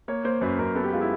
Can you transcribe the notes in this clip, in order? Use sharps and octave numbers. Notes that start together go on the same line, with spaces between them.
A#3 C#5
A#3 C5
F#2 B4
F#2 A#4
B3 A4
G4
G#3 F4
E4